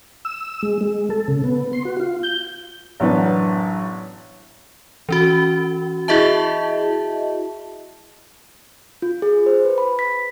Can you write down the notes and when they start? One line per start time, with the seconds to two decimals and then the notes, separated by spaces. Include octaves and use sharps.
0.25 E6
0.63 G#3
0.81 G#3
1.10 A4
1.28 C#3
1.44 B3
1.73 C6
1.85 F#4
2.00 F4
2.23 G6
3.00 A1 F#2 B3 D4
5.09 E3 C#4 F#4
6.08 E4 F#4 G#4 D#5 E5 A5
9.02 F4
9.22 G#4
9.46 C5
9.65 B4
9.78 B5
9.99 B6